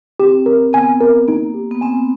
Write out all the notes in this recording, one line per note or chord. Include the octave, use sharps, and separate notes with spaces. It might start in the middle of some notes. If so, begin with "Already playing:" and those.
C4 G4
A#4
B3 G#5
A#4
A#3 D#4
G4
B3
C4 G#5